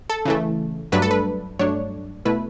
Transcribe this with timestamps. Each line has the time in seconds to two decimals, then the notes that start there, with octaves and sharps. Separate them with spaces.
0.10 A4
0.25 C#3 E3 A3
0.92 G2 F#3 A3 D4 B4
1.02 A4
1.11 B4
1.59 G2 F#3 A3 D4 C#5
2.25 B2 A3 E4 B4